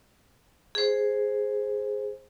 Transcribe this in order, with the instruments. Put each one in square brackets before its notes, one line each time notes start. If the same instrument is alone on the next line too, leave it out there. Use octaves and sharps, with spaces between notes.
[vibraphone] G#4 C5